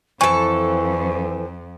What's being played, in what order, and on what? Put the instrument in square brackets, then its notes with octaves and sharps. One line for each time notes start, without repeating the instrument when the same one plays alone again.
[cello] F2 [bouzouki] E3 A4 [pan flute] C5 [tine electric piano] C#6